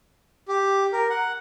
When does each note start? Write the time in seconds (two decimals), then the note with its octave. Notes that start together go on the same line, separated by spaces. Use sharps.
0.48 G4
0.93 A#4
1.10 F#5